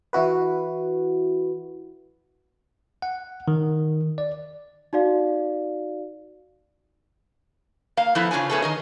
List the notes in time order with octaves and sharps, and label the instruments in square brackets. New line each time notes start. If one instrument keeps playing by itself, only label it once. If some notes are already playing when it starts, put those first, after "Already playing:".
[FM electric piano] E3 E4 F#4 B4
[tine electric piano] F#5
D#3
D5
[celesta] D#4 F#4 D5 F5
[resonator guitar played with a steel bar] A#3 F5
F3 A3 B3 E4
C#3 D4 F4 C#5 G#5
A3 B3 C#4 D#4 G#4 A4
D#3 A#4 D#5